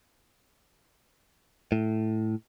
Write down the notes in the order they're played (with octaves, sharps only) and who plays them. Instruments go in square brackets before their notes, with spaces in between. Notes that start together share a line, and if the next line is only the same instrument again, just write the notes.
[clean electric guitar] A2